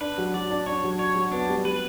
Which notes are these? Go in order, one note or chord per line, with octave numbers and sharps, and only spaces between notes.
D4 B4
F#3
F#3 D5
D4
D4 C#5
F#3
D4 C#5
F#3
B3 D4
G3
G3 B4